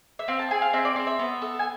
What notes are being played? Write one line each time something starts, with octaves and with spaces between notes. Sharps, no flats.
E5
C4 F5
A5
G#4 G#5
F5
C4 E5
D5
C4 D5
E5
B3
A4
G#5